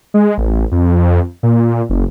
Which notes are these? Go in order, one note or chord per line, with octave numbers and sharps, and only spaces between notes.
G#3
A1
F2
A#2
F#1